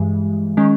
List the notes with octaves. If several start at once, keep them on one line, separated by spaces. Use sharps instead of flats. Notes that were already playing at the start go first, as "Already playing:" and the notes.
Already playing: G2 E3 G#3
D#3 G#3 C#4